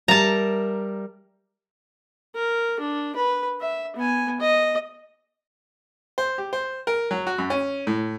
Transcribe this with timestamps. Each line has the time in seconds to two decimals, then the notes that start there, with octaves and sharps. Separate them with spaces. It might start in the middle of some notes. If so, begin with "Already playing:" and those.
0.08 G3 A#4 E5 A5 A#5
2.35 A#4
2.80 D4
3.16 B4
3.61 E5
3.96 B3 G#5
4.40 D#5
6.18 C5
6.38 G4
6.53 C5
6.87 A#4
7.11 F#3
7.27 F#4
7.38 F#2
7.50 C#4
7.87 A2